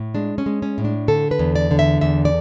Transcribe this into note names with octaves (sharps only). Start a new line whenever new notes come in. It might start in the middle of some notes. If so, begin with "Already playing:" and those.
Already playing: A2
G#3 D4
C#4
G#3
C#4
A2
D4
D3 A4
B4
E2
D5
D3
E5
E2 E5
D5